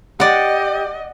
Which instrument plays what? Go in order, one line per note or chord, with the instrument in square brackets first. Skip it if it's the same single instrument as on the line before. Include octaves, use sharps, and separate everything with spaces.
[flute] G4 [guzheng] D5 F#5 [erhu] D#5